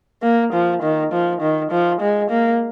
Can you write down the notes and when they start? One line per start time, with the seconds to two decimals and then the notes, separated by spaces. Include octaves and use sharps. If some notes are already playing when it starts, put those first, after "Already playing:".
0.23 A#3
0.53 F3
0.82 D#3
1.12 F3
1.42 D#3
1.72 F3
2.01 G#3
2.31 A#3